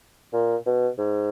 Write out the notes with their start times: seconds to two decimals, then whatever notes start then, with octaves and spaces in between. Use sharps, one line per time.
0.33 A#2
0.66 B2
0.98 G#2